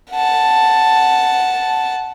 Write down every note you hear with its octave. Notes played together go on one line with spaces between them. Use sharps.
F#5 A5